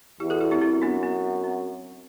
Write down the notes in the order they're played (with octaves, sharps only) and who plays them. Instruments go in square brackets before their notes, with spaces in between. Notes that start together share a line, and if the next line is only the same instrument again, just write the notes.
[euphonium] E2 [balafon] E4 G4
[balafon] F#4 A4
E4 G4
C4 E4
[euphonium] F#2 [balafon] C4 E4
[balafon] B3 D4
B3
C4